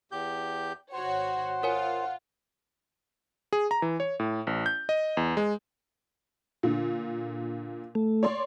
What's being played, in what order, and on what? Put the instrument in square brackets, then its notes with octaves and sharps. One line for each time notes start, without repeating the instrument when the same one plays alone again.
[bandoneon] E2 G4 G6
[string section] G#1 F#4 C#5 [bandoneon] C5 [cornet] F#5
[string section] F4 [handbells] A#4 C#5 G#5
[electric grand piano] G#4
A#5
E3
C#5
A2
A1
G6
D#5
E2
G#3
[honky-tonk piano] A#2 D3
[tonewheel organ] A3
[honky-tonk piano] C#5 D5 C6